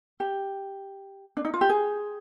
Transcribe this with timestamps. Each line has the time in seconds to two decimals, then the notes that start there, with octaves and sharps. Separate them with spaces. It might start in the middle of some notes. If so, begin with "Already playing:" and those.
0.20 G4
1.37 D4
1.45 D#4
1.54 F4
1.61 G4
1.69 G#4